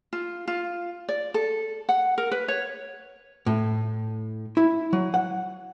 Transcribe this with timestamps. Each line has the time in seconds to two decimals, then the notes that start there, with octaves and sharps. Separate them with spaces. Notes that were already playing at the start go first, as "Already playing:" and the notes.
0.13 F4
0.48 F4
1.09 D5
1.34 A4
1.89 F#5
2.18 A#4
2.32 B4
2.48 C#5
3.46 A2
4.57 E4
4.93 F#3
5.14 F#5